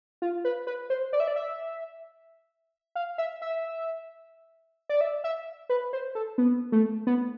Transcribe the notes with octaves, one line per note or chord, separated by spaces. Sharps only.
F4
B4
B4
C5
D5
E5
D5
E5
F5
E5
E5
D5
E5
E5
B4
C5
A4
B3
A3
B3